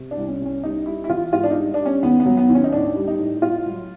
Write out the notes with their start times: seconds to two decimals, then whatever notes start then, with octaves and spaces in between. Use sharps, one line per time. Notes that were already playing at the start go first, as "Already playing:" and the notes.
Already playing: C3
0.11 D4
0.17 C2
0.28 C#4
0.40 C2
0.45 C#4
0.63 G3 D#4
0.86 G3 E4
1.04 E4
1.09 E3 F4
1.33 G#2 F4
1.44 D4
1.50 D#4
1.56 G3
1.74 G3 D4
1.85 C#4
2.03 D#2 B3
2.20 B3
2.26 F#3
2.37 B3
2.49 D#2
2.55 C#4
2.64 D#4
2.73 A2 D4
2.95 G3
3.08 D#4
3.19 A2
3.42 A2 F4
3.66 F#3